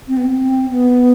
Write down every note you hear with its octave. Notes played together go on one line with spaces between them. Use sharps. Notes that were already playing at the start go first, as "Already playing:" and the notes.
C4
B3
C4
B3